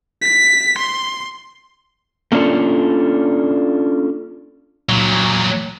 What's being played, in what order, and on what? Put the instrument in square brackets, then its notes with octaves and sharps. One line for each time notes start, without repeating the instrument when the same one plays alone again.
[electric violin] B6
C6
[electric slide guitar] A3 A#3 C#4 D4 F4 A4
[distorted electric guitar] A#2 F#3